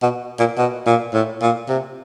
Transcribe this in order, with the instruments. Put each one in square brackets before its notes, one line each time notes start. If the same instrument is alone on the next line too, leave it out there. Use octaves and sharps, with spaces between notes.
[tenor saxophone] B2
A#2
B2
A#2
A2
A#2
C3